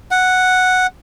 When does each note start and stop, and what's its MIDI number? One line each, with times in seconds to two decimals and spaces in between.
0.11 0.87 78